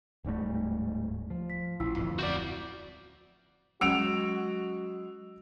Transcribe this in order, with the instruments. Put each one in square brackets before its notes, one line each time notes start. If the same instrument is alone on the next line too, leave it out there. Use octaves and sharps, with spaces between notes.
[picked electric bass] D1 G#2 G3 A3
[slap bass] F3
[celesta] B6
[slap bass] A1 [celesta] E4 F4 E6
[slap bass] D1 F2
[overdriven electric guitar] F#4 D5 [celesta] E5 F#5 G6
[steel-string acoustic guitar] F#3 G#3 [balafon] C#4 F#5 [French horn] F#4 [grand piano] E6 D7 F7